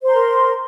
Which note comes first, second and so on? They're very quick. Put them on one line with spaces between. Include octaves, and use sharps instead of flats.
C5 C6 A#5 A#4